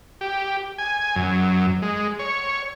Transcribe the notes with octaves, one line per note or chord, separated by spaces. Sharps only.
G4
G#5
F#2
G#3
C#5